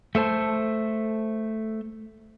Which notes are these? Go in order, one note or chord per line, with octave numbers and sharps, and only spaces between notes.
A3 A4 C5 A5